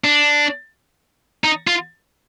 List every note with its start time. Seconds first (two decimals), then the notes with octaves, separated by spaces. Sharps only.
0.04 D4
1.44 D#4
1.67 F4